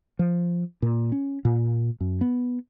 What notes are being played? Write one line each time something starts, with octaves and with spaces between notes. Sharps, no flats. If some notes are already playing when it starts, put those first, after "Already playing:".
F3
A#2
C#4
A#2
F#2
B3